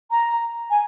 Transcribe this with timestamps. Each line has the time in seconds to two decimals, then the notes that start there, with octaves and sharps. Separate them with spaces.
0.11 A#5
0.70 G#5